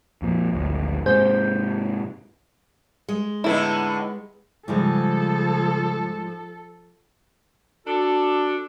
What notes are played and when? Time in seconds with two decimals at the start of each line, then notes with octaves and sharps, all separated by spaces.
0.22 F2 A#2
0.53 G#1 D2
1.06 G#2 C3 G#4 C5 G6
3.09 G#3
3.44 A2 D3 B3 D#4 E4
4.68 G#2 C#3 F3 G3 G#3 A4
7.86 D4 F#4 A4